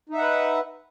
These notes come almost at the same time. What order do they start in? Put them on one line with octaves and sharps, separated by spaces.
D#4 E5 F#5 B4